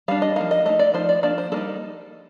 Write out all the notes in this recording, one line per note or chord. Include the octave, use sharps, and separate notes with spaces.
G3 D4 F5
D#5
F3 A#3 D#4 F5
D#5
A3 D#4 D#5
D5
F3 A3 D#4 C5
D5
F3 A#3 D4 D5
C5
G3 A#3 D#4 A4